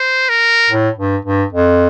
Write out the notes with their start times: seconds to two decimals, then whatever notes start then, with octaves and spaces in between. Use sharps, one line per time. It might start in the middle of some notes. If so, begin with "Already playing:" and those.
Already playing: C5
0.29 A#4
0.70 A2
0.98 G2
1.25 G2
1.53 F2